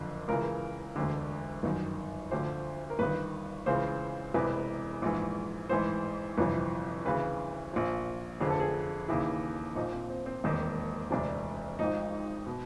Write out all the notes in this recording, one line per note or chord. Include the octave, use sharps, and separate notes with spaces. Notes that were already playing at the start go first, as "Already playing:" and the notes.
Already playing: F#1 F2 D3
C#2 C#3 E3 A#4
E1 D2 D3
G1 F#2 D#3
D2 D3 F3 C5
A#4
G1 G2 D#3 B4
C#2 C#3 E3 C5
E1 E2 C3 E3 B4
A#1 G#2 E3
A1 G#2 E3 C5
G1 F2 C3 E3
D2 C#3 E3 B4
A#1 A#2 F3
F1 F2 D3 F3 G#4
A4
G#4
D#2 C#3 E3 E4
A#1 A#2 F3 D#4
C4
C4
C4
E1 D#2 D#3
E1 D2 C3 D4
G#1 G#2 F3 D#4
B2